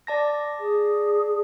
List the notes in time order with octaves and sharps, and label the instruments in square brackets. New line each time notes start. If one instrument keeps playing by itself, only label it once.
[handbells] D5 A5 A#6
[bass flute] G#4